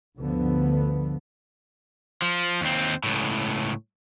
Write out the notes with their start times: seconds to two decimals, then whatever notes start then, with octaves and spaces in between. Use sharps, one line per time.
0.17 D2 G2 D3 F3 B3
2.22 F3
2.61 D#2 C4
3.04 C#2 A2